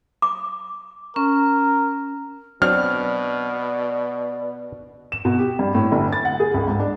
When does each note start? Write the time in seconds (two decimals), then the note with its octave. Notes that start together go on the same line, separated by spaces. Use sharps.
0.22 D6
1.16 C#4 A#4
2.62 B2 F#3 C4 D4 D5 F6
5.12 E7
5.25 B2
5.38 G4
5.59 G2
5.75 A2
5.92 G1
6.13 A6
6.25 F#5
6.40 G#4
6.54 C#2
6.67 G#2
6.80 D4